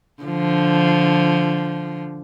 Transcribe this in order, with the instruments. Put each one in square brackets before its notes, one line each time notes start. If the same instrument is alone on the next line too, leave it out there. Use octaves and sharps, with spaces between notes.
[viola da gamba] D3 F3